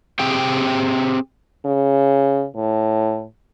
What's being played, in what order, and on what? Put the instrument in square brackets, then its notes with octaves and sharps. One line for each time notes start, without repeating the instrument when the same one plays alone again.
[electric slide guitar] C4 G4 G#4 G5
[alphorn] C#3
A2